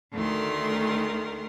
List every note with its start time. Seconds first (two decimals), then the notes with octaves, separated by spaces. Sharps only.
0.13 D2 D#3 A3 A#4 C6